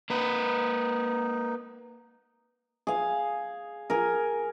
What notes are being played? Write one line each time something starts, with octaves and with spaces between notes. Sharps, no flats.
A#3 D#4 B4
G#4 F5
G#4 A#4